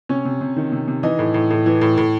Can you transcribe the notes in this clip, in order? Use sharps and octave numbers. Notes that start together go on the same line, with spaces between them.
C3 C#4 C#5
C3
C3
D#3
C3
C3
E3 D#4 D#5
A2
A2
A2
E3
A2
A2